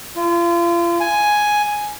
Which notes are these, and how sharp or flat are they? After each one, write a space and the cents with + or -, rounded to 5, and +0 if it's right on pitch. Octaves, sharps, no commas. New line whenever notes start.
F4 -35
G#5 +5